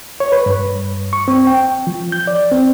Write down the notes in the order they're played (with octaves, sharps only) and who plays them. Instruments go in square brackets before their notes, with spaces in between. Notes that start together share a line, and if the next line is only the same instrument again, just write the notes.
[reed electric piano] C#5
B4
G2
C#6
C4
G5
F3
G6
D5
C4